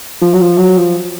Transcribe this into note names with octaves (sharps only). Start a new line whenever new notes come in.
F3
F#3
F3
F#3
F3